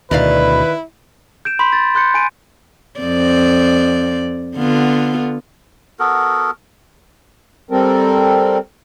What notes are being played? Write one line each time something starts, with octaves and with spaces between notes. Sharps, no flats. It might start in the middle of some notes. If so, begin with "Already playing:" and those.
D2 B2 D#3 E4 B4 D5 F5
G6 D7 E7
B5 C6 B6
A6
C6 F#6 G6 C#7
G#5 D7 D#7
F2 C4 D5
D3 B3 F4
B3 F#4 A4 A#4
G3 C4 A4 A#4